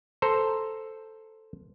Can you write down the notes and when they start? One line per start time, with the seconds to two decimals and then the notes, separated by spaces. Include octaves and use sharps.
0.22 A4 C5 A#5